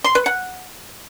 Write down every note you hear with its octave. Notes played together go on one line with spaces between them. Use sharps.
C6
B4
F#5